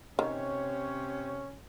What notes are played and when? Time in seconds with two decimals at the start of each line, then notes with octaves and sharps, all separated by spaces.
0.19 C3 D#3 C#4 C#5